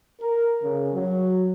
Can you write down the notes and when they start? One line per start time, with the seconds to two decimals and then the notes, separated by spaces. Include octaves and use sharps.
0.21 A#4
0.62 C#3
0.93 F#3